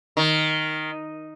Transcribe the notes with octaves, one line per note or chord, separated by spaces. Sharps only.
D#3